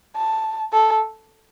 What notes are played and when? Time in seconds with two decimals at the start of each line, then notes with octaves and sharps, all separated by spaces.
0.16 A5
0.73 A4